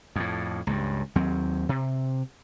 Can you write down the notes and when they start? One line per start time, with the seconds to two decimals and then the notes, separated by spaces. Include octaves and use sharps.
0.16 F2 A2
0.67 C#2 G2
1.15 D#2 F#3 C4
1.69 C3